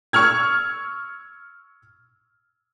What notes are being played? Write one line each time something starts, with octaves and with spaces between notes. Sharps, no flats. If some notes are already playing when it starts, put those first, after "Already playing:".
C#6 E6 F6 G#6